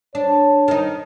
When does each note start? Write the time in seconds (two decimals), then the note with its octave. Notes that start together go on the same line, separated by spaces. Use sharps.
0.15 D4 C#5
0.68 D#3 D#4